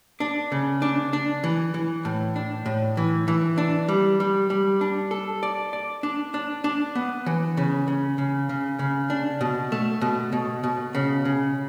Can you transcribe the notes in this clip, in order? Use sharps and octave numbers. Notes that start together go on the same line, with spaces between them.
D4
C#3
D4
D4
E3
E3
A2
D4
A2
E3
E3
D4
G3
G3
G3
D4
A4
D5
D5
D4
D4
D4
B3
E3
C#3
C#3
C#3
C#3
C#3
D4
B2
A3
B2
B2
B2
C#3
C#3